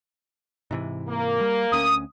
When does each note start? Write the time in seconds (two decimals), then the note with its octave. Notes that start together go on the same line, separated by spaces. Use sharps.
0.71 G#2 C3 E3
1.09 A#3
1.41 G3
1.72 D2 B3 C#4 D#6